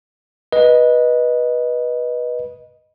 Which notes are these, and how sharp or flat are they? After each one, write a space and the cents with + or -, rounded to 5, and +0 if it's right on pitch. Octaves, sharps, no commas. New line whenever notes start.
B4 -20 D#5 +0